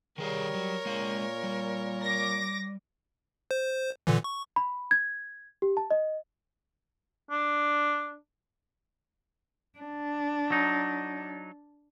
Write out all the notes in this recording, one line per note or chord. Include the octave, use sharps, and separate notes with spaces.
D#3 G3 G#4 A#4 C#5 F5
F#3
A#2 G#3 F5
G3
D6 A#6
C5
A#2 D3 E3
C#6
B5
G#6
G4
A5
D#5
D4
D4
F#3 D#4